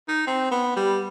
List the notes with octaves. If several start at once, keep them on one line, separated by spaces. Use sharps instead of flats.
D#4
C4
B3
G3